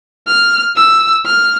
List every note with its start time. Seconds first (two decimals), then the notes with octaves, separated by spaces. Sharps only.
0.27 F6
0.77 E6
1.26 F6